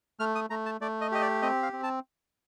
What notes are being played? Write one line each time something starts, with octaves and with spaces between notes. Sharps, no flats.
A3 F6
D#6
A3 A#5
A5
A3 D5
D#5
G4 D#5
D5
C4 D#5
F5
C4
A5